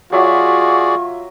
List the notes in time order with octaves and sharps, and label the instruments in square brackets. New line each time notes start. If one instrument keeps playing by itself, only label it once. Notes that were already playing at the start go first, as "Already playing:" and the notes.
[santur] F#3 E5 D6 [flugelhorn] F4 [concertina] F#4 G#4 D5 [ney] C#6